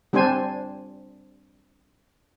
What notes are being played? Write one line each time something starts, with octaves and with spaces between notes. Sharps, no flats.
G3 C4 D4 C5 G#5